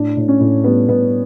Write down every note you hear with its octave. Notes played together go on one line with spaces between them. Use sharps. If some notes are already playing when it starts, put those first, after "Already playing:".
Already playing: A2 D4
A2
C#4
A2
G3 B3
A2 B3